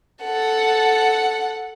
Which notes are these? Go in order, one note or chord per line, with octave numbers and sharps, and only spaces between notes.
A4 F#5